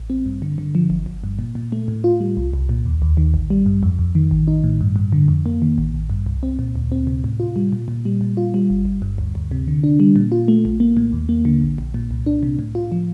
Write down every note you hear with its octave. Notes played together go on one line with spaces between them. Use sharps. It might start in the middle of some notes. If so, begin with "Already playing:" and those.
Already playing: A1
C4
G2
D3
D3
F3
G1
G1
G2
A#2
A#2
A3
A2
F4
G3
C2
C2
A#2
D#2
D#2
D#3
A1
G3
G2
F2
F2
D#3
A1
D#4
A2
G2
G2
D3
F2
A#3
D#3
A1
A1
G2
C2
C4
A#2
D2
C4
C3
A2
F4
G3
A#2
A#2
G3
A#2
F4
G3
G1
G1
G2
D2
D2
C3
D3
D4
G3
A#2
F4
A3
A#1
A#3
A2
D#2
A#3
D3
A#1
A#1
A#2
C2
D4
C3
A2
F4
F3